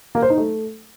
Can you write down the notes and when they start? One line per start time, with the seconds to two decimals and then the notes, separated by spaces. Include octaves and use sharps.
0.15 A#3
0.22 C5
0.30 D#4
0.38 A3